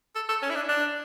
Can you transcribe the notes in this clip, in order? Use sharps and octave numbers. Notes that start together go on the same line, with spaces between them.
A4
A4
C#4
E4
D4
D4